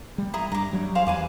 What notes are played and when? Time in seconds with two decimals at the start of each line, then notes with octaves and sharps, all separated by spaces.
0.18 G3
0.34 E4 A#5 D#6
0.52 G2 A#5 D6
0.73 F#3 G3
0.95 G#4 C5 F5
1.07 E2 B4 G#5 D6